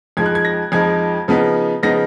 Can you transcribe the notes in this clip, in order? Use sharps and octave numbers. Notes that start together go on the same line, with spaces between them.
F2 F3 G#3 D#4 G#6
F#6
G#6
A#6
F2 F3 G#3 D#4 G#6
C#3 F3 B3 D#4
C#3 F3 B3 D#4 A#6